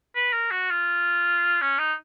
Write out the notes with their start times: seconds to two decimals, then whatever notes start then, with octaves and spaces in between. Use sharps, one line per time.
0.15 B4
0.33 A#4
0.51 F#4
0.70 F4
1.61 C#4
1.79 D#4